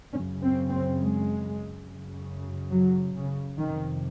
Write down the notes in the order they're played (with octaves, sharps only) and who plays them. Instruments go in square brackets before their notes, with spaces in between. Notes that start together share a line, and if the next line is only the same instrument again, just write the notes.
[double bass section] C#3 C#4
F#2
C4
C4
G#3
F#2 C#3
F#3
C#3
F2 C3 D#3